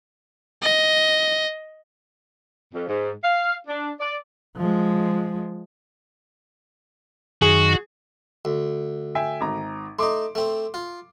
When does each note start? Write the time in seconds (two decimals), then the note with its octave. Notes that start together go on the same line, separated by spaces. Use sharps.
0.62 D#5
2.74 F2
2.88 G#2
3.24 F5
3.67 D4
4.00 D5
4.57 F3 G#3
7.42 F#2 D#3 F#4 G#4
8.45 D2
9.15 E5 G5 G#5
9.41 G#1 A#5
9.99 A3 D#4 C6 D6
10.35 A3 C4
10.74 F4